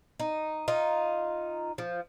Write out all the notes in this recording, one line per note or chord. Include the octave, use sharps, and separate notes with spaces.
D#4
D#4 F4
F3